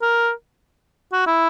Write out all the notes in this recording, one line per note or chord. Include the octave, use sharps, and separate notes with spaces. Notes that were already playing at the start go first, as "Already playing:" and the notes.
A#4
F#4
E4